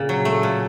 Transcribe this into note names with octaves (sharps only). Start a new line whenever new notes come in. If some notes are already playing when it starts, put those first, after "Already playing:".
Already playing: A#2 C#3
F#3
A3
A#2